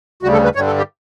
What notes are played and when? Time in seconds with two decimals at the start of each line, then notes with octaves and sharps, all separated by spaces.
0.23 D2 C#3 G3 F#4
0.33 A4
0.44 B4
0.55 G2 D3 G3 C#5
0.67 A4
0.78 G4